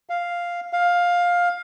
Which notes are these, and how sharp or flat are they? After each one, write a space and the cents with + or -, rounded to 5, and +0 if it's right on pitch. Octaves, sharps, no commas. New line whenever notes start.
F5 +0
F5 +15